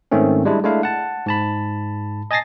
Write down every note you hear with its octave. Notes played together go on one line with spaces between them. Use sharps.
G#2 D#3 A3 C4 C#4
G3 G#3 D4 E4
G#3 A3 D4 E4 F5
F#5 A5
G#2 A5 B5
D#5 G#5 A5 A6 A#6 C7